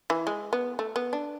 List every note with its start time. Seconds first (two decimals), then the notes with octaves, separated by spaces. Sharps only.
0.10 E3
0.27 G#3
0.53 B3
0.79 A3
0.96 B3
1.13 D4